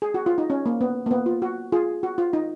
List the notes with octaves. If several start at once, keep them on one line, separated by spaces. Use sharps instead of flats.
G#4
F#4
F4
D#4
C#4
A#3
B3
A#3
B3
F4
F#4
F4 G#4
F#4
F4
D#4